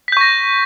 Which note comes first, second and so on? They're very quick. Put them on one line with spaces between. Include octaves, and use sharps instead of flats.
B6 G6 C#6 A#6